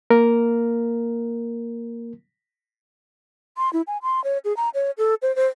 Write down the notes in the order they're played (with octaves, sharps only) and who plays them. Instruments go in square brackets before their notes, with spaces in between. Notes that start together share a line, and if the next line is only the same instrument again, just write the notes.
[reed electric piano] A#3 A#4
[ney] C6
E4
G#5
C6
C#5
G#4
A#5
C#5
A4
C5
C5